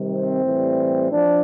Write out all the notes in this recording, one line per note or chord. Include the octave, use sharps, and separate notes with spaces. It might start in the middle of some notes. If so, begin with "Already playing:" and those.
Already playing: C3 D#3 G3
C4
A2 E3 G3
F3 D4